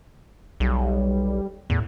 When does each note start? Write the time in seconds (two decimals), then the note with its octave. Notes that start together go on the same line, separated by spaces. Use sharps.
0.60 B1 G3
1.70 E2 A2